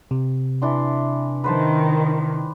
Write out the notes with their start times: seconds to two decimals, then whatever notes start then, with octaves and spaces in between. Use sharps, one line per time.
0.11 C3
0.62 E3 D4 C6
1.44 D#3 B4 C5 A5